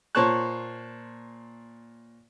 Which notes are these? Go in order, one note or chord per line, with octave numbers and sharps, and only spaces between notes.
A#2 C5 C#5 A5 C#6 F#6